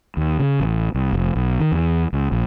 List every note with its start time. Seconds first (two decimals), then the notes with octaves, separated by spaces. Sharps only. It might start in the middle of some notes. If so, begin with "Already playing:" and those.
0.17 D#2
0.40 C#3
0.60 A1
0.95 C2
1.13 F1
1.35 B1
1.60 D#3
1.72 E2
2.13 C#2
2.32 A#1